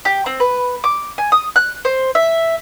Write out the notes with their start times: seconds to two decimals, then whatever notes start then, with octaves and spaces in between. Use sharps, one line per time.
0.05 G4
0.26 C4
0.40 B4
0.84 D6
1.18 G#5
1.32 D#6
1.56 F#6
1.85 C5
2.15 E5